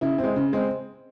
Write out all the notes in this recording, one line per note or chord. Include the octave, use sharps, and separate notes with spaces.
C#3 E4
C4
G#3
C#3
G#3 C4